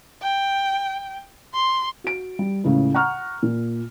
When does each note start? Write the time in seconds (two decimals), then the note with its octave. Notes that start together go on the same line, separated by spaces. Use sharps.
0.22 G5
1.53 C6
2.04 F#4 D7
2.39 G3
2.64 C#2 A2 C#3
2.95 F#5 A#5 C#6 F6
3.43 A#2